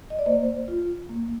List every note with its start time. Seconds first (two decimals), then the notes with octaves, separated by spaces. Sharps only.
0.10 D#5
0.19 D5
0.26 A#3 C5
0.68 F4
1.09 A#3